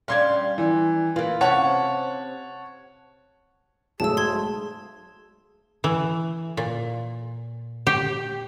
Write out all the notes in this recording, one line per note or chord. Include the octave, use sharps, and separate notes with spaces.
G3 C#4 D4 F5 C6 G#6
E3
E3 A#3 F4
C3 C#4 C#5 F#5 A5
B1 G#2 A3 G#4 A5 E6
C6 G#6
E3
A#2
G4